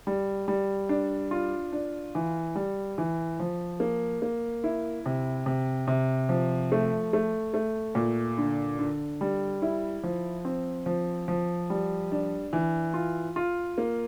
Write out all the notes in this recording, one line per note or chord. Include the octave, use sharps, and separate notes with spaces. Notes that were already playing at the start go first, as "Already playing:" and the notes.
G3
G3
D4
F4
D4
E3
G3
E3
F3
A#3
A#3
E4
C3
C3
C3
F3
A3
A3
A3
A#2
D3
D3
G3
E4
F3
C4
F3
F3
G3
D4
E3
F4
F4
A#3